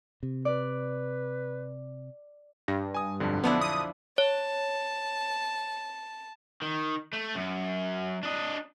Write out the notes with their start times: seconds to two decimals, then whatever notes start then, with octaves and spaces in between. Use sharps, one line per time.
0.23 C3
0.45 B4 D5
2.68 G2 A#6
2.94 G#5 D#6
3.20 B1 F2 D3
3.44 F3 B3 D4 E4
3.61 D#6
4.18 C#5 A5
6.62 D#3
7.13 A3
7.35 F#2
8.23 D4 D#5